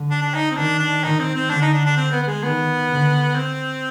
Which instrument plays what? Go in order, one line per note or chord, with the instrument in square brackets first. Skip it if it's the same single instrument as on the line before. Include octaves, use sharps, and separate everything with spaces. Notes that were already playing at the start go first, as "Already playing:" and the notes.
Already playing: [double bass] D3
[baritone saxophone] D4
D4
D#4
C4
[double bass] D#3 [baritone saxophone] D4
[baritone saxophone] D4
[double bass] D#3 [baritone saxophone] D#4
[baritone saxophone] C4
C4
[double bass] D3 [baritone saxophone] D4
[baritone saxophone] D#4
D4
D4
C4
B3
B3
G#3
[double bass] D#3 [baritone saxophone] B3
[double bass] D3
[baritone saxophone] C4